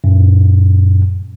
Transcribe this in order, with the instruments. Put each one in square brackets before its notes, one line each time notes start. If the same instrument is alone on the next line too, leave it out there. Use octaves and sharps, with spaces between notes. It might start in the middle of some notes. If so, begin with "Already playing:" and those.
[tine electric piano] F#2 A#2